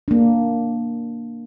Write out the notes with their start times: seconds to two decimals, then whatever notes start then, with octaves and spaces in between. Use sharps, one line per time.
0.08 A#3 D4